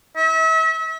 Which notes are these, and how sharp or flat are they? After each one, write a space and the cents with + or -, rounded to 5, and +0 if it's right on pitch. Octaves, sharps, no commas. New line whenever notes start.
E5 -35